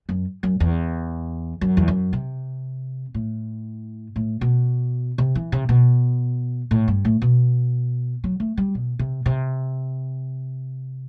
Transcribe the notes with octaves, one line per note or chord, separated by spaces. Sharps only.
F#2
F#2
E2
F#2
E2
F#2
C3
A2
A2
B2
C3
E3
C3
B2
A2
G2
A2
B2
F#3
A3
G3
B2
C3
C3